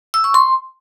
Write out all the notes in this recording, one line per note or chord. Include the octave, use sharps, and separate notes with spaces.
E6
C#6
C6